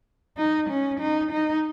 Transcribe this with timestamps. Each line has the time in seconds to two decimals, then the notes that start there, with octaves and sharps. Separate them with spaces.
0.38 D#4
0.70 C#4
1.00 D#4
1.31 D#4